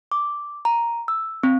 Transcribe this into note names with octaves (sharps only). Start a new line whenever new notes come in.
D6
A#5
E6
C4